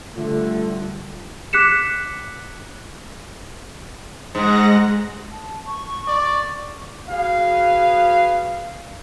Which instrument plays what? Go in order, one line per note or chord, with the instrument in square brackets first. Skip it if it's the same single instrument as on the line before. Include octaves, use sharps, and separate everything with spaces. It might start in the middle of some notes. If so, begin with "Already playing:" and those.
[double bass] D3 G3 [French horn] A3 [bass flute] F4
[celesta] D6 F#6 B6 C#7 E7
[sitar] G#2 [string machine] G#3 F#5 A#6
[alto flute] A5
C#6
[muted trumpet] D5
[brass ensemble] F#4 G#4 B4 F5